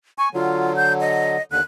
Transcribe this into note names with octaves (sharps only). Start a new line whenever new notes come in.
G#5 C#6
D3 F#3 F4
G6
D#5
D#2 D3 F#6